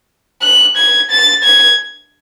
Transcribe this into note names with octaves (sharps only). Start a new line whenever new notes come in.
F#6
G#6
A6
G#6